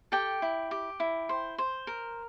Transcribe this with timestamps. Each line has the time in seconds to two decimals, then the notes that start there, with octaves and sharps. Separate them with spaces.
0.12 G4 A4 G5
0.42 E4
0.71 G4
1.00 E4
1.29 C5
1.58 C5
1.87 A#4